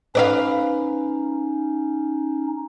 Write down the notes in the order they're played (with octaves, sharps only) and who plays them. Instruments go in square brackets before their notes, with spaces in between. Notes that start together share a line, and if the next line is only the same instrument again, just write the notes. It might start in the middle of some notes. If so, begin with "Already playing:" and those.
[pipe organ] C#4 D#4 [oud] B4 D5 F5